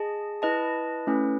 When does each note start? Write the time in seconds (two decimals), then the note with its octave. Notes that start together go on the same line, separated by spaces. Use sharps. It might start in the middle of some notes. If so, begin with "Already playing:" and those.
Already playing: G#4 D#5 A5
0.42 E4 B4 D#5 A5
1.07 A3 C#4 E4 B4